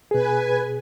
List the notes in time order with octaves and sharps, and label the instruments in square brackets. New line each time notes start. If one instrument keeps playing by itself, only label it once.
[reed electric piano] B2 G#4 [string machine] B4 G#5